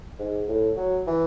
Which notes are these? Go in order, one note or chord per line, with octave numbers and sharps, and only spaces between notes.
G#2
A2
F#3
E3